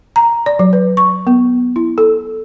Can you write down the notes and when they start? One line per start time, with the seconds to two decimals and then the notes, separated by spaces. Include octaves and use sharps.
0.16 A#5
0.46 D5
0.59 F#3
0.73 B4
0.97 C#6
1.27 B3
1.76 E4
1.98 A4